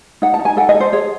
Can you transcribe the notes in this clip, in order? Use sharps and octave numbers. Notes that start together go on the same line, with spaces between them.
D#4 F#5
A5
D#4
G#5
A4 F#5
D#5
A4
C5
G#4 C#5